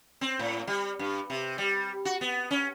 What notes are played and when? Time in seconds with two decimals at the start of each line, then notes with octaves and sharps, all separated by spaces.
0.21 C4
0.39 A2
0.67 G3
0.99 G2
1.30 C3
1.58 G3
2.05 F#4
2.21 B3
2.51 C#4